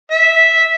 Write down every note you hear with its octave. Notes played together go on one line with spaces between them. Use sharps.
E5